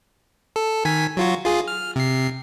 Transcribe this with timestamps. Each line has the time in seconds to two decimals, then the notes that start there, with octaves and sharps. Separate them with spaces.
0.56 A4
0.85 D#3 G#5 B6
1.17 F#3 F4 F#4
1.44 F4 G#4
1.68 F6
1.96 C3 C7